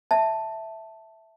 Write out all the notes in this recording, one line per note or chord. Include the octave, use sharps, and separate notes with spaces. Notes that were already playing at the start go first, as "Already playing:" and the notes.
E5 A5